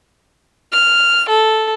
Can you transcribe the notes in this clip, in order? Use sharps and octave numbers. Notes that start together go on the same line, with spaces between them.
F6
A4